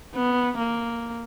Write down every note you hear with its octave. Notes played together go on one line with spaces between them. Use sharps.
B3
A#3